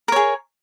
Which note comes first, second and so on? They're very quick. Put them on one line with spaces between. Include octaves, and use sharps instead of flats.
A#4 C#5 G#4